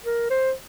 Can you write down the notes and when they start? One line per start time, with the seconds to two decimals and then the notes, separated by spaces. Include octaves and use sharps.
0.05 A#4
0.30 C5